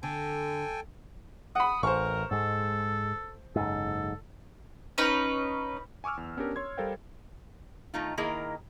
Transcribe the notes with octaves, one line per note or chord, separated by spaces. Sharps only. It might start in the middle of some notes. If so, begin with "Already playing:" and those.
D3 A4 G5 G#5
F#5 B5 D#6
A1 A#4 C5 C#6
G#2 G#3 A4
F#1 G#2 A4
C#4 D#4 B4
G#5 C#6 D6 E6 F6
E2
B3 C#4 D4 G4 A#4
C#5 C6 G#6
G3 A4 A#4 C5 F5 G5
D#3 A3 D#4 F4
D#3 A#3 E4 G#4 A#4 D#5